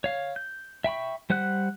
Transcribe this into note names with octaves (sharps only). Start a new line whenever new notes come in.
C#5 F5
G6
E5 G5 B5 C#6
G3 C5 F#5 F#6